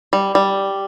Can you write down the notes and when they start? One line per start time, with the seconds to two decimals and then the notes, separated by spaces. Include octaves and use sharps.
0.13 G3
0.35 G3